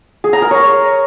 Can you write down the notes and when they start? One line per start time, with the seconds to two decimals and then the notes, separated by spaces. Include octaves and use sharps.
0.24 G#4
0.33 A#5
0.42 A#4
0.51 C#5